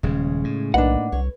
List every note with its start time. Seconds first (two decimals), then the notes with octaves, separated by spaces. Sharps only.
0.03 D#1 C#3 G#3
0.44 A2
0.74 B1 A#3 D4 D#4 B4 F#5
1.12 C2 C#5